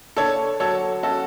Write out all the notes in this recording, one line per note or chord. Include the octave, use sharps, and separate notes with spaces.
D3 A4 C#5
F#3 A4 C#5
C#4 F#4 A4